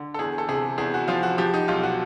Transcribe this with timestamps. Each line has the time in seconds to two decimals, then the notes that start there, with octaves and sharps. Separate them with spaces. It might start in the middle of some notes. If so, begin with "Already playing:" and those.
Already playing: D3
0.14 A4
0.19 E2 G#4
0.38 A4
0.48 C3 G#4
0.78 E2 G#4
0.94 F#4
1.08 F3 F4
1.23 F#4
1.38 F3 G4
1.54 D#4
1.68 B1 F4
1.83 F#4